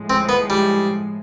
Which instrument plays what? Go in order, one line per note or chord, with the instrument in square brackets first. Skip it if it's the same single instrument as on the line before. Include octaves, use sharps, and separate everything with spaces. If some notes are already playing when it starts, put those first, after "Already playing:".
Already playing: [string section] A2 F3 G#3
[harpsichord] C4
B3
G3